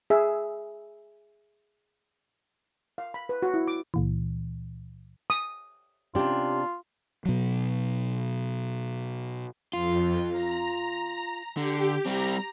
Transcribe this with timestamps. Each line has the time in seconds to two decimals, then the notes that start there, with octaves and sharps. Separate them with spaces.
0.10 G#4 E5
2.98 F5
3.14 B5
3.29 B4
3.42 F#4
3.54 E4
3.67 D6
3.94 C#2 A#2 E3
5.30 D#6
6.15 C3 C#4 D4 F4 G4
7.25 B2 F#3
9.73 F2 F4
10.32 A#5
11.57 D3 G4
12.06 G3 C4 A#5